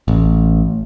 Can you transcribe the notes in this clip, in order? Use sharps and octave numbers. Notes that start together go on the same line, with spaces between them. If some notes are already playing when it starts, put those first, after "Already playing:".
A1